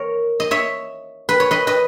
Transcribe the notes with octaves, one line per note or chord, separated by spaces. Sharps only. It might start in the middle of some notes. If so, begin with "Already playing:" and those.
Already playing: A#4 C#5
D#5
C#5 E5
B4
C#5
B4 D#5
B4 D#5